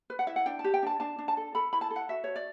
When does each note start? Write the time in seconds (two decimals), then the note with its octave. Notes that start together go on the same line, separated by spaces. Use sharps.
0.10 B4
0.19 F#5
0.27 E4 E5
0.36 F#5
0.46 D4 G5
0.59 A5
0.64 G4
0.74 G5
0.83 D4 A5
1.00 D4 A5
1.19 D4
1.28 A5
1.37 A4
1.55 A4 B5
1.73 E4 B5
1.81 A5
1.91 A4
1.96 F#5
2.09 F#4 E5
2.24 F#4 C#5
2.36 D5